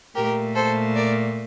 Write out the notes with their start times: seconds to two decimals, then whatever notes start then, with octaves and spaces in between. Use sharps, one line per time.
0.15 A#2 A3 G4 A#4
0.55 A4 C5
0.96 A#4 D5